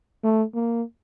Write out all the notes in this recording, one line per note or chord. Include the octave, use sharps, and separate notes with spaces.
A3
A#3